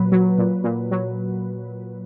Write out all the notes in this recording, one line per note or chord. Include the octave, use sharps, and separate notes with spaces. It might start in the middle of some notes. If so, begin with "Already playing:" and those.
Already playing: A#2 F#3 B4
F#3
A#2
A#2
F#3